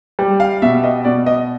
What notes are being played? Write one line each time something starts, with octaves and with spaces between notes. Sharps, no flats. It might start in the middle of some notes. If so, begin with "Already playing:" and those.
G3
F5
B2 E5
D#5
B2 D5
D#5